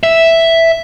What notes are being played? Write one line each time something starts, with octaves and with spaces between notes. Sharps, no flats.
E5